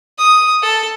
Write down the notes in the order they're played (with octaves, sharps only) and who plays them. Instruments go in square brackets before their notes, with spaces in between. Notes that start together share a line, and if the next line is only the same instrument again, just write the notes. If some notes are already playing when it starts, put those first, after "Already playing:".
[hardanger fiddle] D#6
A4